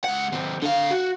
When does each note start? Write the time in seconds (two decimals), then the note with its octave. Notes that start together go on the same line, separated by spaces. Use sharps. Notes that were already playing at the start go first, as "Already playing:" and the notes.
0.04 C#2 F#5
0.32 D#2 C4
0.62 D3 F5
0.90 F#4